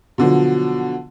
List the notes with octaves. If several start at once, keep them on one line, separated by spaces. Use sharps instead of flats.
B2 D3 F3 F#3